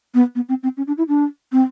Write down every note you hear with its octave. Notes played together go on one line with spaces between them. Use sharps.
B3
B3
C4
C4
C#4
D4
E4
D4
C4